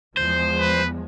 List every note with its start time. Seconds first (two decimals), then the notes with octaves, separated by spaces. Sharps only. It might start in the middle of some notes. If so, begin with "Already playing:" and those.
0.17 E2 F3 G#3 C5
0.59 B4